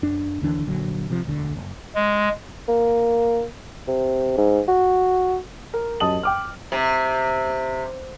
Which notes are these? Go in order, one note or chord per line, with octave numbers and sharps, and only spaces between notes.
F#2 D4
D#2 D3 E3 D4
A#1 D3 F#3
C3 F3
E1 D2 D3
F#1
G#3
A#3
C3
G#2
F#4
A#4
F#2 G4 D#5 A5 D#6 F#7
G5 D6 F6
C3